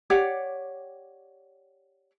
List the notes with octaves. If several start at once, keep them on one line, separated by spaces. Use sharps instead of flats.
G4 C#5 D5 F#5